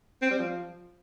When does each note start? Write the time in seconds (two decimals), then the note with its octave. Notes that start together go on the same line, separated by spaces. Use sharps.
0.22 C4
0.30 G3
0.38 F3